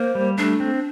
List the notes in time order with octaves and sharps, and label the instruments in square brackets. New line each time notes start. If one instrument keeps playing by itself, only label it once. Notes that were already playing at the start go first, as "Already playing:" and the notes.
Already playing: [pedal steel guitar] A#3 [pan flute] C5
[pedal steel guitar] G3
[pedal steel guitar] A3 [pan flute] D4
[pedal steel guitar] C4